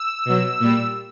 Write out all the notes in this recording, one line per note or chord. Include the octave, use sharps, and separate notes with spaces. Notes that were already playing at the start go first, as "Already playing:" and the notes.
Already playing: E6
B2 F#3
A#2 G3